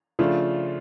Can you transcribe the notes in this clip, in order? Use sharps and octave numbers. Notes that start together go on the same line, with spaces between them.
C#3 F3 A3 D4 F4